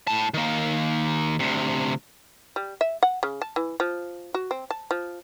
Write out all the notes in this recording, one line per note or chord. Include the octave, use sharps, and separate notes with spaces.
A2 A5
D#3 A#3
D2 C3
G3
E5
F#5
C#3
A5
E3
F3
F#4
C4
A5
F3